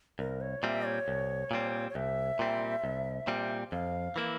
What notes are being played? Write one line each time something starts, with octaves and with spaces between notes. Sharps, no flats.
C2 A#4
C#5
A#2 G3 C4 E5
C#5
C2
A#2 G3 C4
C#5
C2 E5
A#2 G3 C4
C2
A#2 G3 C4
F2 F5
E3 A#3 E4